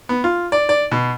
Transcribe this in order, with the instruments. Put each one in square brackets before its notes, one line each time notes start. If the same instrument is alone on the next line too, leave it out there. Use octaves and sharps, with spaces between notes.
[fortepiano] B3
F4
D5
D5
B2